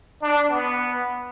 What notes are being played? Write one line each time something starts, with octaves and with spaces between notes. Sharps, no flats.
D4
B3